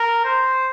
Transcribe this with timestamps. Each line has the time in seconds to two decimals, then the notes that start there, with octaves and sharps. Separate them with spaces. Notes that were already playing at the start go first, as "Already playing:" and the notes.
Already playing: A#4
0.24 C5